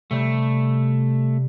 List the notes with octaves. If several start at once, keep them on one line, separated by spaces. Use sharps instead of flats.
C3 G3 A3